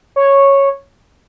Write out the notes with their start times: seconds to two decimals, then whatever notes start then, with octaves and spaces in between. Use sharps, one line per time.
0.16 C#5